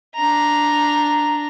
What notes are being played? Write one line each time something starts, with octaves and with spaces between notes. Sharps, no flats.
D4 A#5